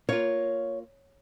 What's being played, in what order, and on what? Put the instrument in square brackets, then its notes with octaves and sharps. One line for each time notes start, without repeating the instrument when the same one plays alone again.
[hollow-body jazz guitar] A#3 F4 [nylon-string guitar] C#5